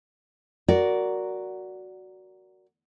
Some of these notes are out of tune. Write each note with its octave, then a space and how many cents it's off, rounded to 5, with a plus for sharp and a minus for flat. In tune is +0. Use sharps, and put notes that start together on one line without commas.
F#4 +0 A#4 +0 D5 -15